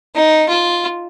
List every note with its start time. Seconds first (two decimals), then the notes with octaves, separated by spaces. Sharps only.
0.15 D#4
0.49 F4